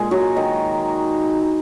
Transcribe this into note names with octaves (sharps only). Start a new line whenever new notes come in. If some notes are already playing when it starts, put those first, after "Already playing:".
Already playing: A#2 G#3 G#4
F#3 F#4
D#3 D#4